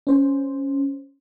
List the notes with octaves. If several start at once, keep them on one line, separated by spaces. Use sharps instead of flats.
C#4 C5